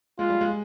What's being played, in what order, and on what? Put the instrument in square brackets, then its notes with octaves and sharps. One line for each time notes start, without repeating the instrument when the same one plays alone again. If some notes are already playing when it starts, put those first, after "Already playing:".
[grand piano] G#3 [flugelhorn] F4
[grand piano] G3
G#3